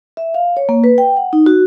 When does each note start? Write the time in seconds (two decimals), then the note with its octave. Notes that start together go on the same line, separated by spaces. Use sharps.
0.17 E5
0.34 F5
0.57 C#5
0.69 A#3
0.84 B4
0.98 G5
1.17 F#5
1.33 D#4
1.46 F#4